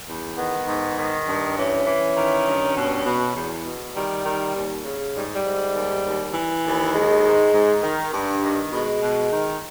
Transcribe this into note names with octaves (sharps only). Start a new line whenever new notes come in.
E2
D#3 B3
G#2
D#3
G2
E3 C#4
E3
D#3
G2
B2
B2
E2
B2
D#3 G3
D#3
D#2
C#3
G#2 G3
G3
G#2
D#2
D#2
E3
D#2
D#3 G#3
G#2
G#2
D#3
G2
D#3
B2 G#3
B2
D#3